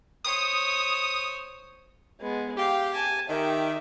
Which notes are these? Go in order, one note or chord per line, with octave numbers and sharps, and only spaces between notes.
C5 C#5 D#6
G#3 B3
G4 F5
G#5 A5
D#3 G4 E5